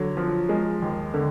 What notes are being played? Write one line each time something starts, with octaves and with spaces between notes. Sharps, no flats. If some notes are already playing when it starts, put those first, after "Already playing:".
Already playing: D3 F#3
F3
G#3
D#2
D3